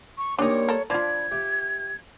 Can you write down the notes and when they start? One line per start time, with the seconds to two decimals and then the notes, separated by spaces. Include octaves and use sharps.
0.18 C#6
0.39 A#2 G3 A#3 D4 D#4 C#5
0.69 A4 A#4
0.90 F3 D4 F4 B5 G#6
1.31 G4 E5